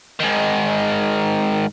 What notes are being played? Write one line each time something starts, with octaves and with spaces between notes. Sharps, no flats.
G#2 D#3